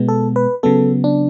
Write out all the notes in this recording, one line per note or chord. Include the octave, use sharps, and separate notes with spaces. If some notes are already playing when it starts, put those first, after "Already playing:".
Already playing: B2 G#3 B3
A4
B4
C#3 F#3 B3 A4
D4